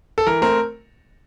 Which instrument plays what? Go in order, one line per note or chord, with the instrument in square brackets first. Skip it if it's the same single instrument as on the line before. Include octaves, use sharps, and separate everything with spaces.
[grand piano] A4
E3 A#4
A3 C4 A#4